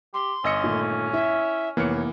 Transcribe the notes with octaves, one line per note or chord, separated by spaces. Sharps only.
G4 C6
G1 C#4 D#5 E6 C#7
A#2 D#3 A3
E4 E5
F1 E3 A#3 B3 C#5 F6 C#7